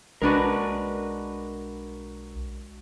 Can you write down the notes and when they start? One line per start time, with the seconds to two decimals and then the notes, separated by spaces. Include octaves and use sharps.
0.22 B1 G#3 D4 F#4 A#4 B4